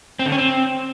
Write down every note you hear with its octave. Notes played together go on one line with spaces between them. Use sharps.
C4
D3
C#4
C4